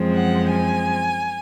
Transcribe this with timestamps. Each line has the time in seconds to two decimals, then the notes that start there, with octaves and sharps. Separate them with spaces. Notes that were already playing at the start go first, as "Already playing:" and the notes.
Already playing: F#2 F3 G#3 C4
0.15 F#5
0.51 G#5